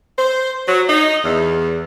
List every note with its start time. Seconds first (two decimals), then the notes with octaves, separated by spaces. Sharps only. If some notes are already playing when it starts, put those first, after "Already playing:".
0.19 C5
0.68 F#3
0.89 D#4
1.25 E2